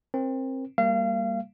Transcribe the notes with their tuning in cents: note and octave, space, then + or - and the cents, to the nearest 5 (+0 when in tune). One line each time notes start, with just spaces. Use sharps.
C4 +25 A#4 +20
G3 +20 A#3 -10 F5 -35